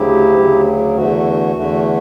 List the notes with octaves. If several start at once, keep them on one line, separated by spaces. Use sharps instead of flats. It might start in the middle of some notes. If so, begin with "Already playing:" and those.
Already playing: D2 C#3 F#3 E4 G4
D2 C#3 F#3
E2 D3 A3 F#4
E2 D3 A3